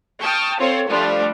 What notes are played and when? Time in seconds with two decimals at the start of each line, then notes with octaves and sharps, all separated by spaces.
0.20 G5 A5 C#6 D#6 F6
0.60 C4 F4 A4 C5 C#5
0.89 F3 G3 A3 D4 F4